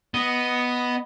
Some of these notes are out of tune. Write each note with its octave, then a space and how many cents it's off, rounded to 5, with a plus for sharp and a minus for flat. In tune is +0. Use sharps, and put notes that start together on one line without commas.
B3 +0 D#5 +0